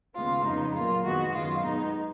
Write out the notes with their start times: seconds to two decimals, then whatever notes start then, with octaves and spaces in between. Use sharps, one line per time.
0.14 D#2 C#3 G#3 B3 F4
0.44 F2 C#3 F3 G#3 B3 D#4
0.74 A#2 F#3 A#3 F4
1.03 F2 D#3 G#3 B3 F#4
1.33 F#2 D#3 G#3 B3 F4
1.63 B2 G#3 B3 D#4